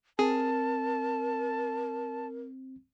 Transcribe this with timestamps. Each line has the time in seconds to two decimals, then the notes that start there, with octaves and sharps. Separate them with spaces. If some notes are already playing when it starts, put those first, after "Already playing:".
0.19 C4 G#4 A#4 A5